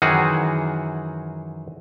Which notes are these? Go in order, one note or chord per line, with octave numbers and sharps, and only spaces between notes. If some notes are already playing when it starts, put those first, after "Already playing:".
F#2 D#3 E3 F#4 G#4